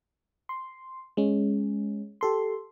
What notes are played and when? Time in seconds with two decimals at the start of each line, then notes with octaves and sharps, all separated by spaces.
0.49 C6
1.17 G#3 C#4
2.21 G4 A4 C6